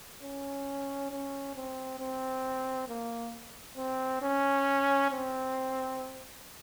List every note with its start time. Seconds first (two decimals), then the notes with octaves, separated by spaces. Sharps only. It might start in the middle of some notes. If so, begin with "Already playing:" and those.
0.23 C#4
1.11 C#4
1.56 C4
1.99 C4
2.89 A#3
3.77 C4
4.22 C#4
5.11 C4